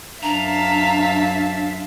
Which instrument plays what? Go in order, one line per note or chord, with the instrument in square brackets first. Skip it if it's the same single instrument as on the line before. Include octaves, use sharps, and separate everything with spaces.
[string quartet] F#2 A5 [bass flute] D4 [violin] E5 F5 [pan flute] A#5